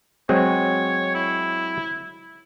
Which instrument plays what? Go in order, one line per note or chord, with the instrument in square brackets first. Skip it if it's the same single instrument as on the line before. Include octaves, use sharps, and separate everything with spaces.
[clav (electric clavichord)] F#3 G#3 C4 [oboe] C#5
[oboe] E4